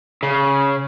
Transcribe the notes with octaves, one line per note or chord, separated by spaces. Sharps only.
C#3